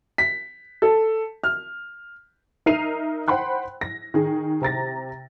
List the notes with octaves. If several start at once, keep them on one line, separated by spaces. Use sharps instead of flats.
B6
A4
F6
D#4 A#4 E5 C7 D#7 F7
C5 F#5 G5 B5 C6 F#6
A#6
D#3 G#4
C3 A#5 A6 A#6